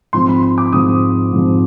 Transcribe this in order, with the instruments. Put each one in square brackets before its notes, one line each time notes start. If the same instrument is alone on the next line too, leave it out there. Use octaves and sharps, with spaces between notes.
[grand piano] G#2 F3 C4 C6
B5
C6
D6
G#2 F3 C4 D#6
G#2 F3 C4